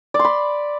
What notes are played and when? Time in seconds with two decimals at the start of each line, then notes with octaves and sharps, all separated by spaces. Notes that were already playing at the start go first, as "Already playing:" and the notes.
0.14 D5
0.19 C6
0.25 B5